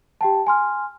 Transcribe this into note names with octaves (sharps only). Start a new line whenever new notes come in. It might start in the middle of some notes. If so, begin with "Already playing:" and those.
G4 G5 A5
G#5 C6 F6